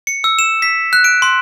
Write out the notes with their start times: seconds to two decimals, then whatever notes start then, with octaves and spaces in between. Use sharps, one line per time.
0.07 C#7
0.24 E6
0.39 E7
0.62 B6
0.93 F#6
1.04 D7
1.22 C6